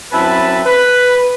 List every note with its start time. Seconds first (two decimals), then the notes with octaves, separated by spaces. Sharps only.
0.12 F#2 C4 E4 B4 A5
0.66 B4